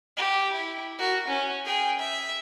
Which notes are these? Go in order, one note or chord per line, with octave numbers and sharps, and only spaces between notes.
G4
E4
F#4 A#4
C#4
G#4 G5
E5